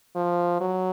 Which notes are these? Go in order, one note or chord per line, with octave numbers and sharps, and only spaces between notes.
F3
F#3